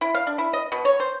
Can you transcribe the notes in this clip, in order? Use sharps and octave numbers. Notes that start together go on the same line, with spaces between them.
E4
F5
D4
E4
D#5
B2
C#5
C5